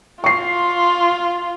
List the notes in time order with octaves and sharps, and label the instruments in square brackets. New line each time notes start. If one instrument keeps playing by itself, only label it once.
[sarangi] F4 [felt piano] C#6 C7